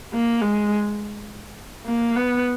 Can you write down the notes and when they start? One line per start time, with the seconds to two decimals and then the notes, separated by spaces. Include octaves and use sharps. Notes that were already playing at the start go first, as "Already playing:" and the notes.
0.14 A#3
0.41 G#3
1.86 A#3
2.16 B3